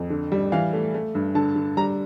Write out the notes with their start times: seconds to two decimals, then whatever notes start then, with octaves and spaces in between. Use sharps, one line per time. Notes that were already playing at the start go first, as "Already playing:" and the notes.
Already playing: F2
0.10 D3
0.32 G3
0.52 E3 F5
0.73 A3
0.94 A3
1.15 G2
1.35 D3 A5
1.56 D3
1.77 G3 A#5